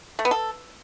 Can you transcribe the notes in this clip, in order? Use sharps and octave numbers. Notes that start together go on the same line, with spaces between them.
A3
B3
A4